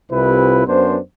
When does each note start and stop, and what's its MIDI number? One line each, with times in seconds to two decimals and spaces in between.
0.11 0.67 36
0.11 0.67 48
0.11 0.67 64
0.11 0.67 65
0.11 0.67 71
0.67 0.97 42
0.67 0.97 59
0.67 0.97 62
0.67 0.97 72